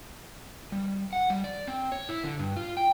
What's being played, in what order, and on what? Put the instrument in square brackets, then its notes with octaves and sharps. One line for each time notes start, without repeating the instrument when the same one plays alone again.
[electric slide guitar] G3
F#5
G3
D5
C4
C#5
E4
D3
G2
F4
G5